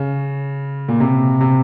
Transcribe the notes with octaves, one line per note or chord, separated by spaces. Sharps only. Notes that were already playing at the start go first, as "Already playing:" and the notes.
Already playing: C#3
A#2
C3
C3